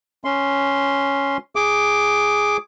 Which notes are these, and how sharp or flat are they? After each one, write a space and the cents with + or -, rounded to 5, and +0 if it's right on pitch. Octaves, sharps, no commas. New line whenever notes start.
C#4 +0 C6 +0
G#4 +0 D6 +0